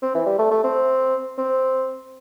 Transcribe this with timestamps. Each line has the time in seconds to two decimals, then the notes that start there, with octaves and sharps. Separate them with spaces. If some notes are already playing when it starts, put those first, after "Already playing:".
0.02 C4
0.15 E3
0.26 G3
0.39 A3
0.51 A3
0.64 C4
1.38 C4